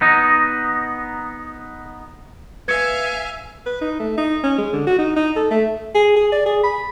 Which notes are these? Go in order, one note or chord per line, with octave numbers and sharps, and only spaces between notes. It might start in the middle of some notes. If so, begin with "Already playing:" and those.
B3 D#4 D#5
B4 E5 F5 G#5 G#6 C#7
B4
D#4
A3
D#4
C#4
G#3
D3
F#4
D#4
D#4
A4
A3
G#4
G#4
D5
G#4
B5